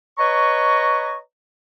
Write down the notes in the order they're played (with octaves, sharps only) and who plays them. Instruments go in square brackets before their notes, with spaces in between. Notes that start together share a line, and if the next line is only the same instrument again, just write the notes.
[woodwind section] B4 C#5 D#5 A#5 C#6